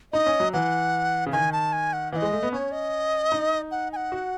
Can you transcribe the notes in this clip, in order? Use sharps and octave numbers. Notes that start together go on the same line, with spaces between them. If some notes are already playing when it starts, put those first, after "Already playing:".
D#4 D#5
C#4
F#3
E3 F#5
C#3
D#3 G#5
A5
G#5
F#5
E3 D#5 F#5
G#3
A3
B3
C#4 C#5
D#5
D#4
F#5
G#5
F#5
F#4